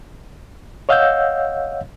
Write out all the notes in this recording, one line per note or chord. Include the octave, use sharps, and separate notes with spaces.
C#5 D#5 F5 F#5 E6 G6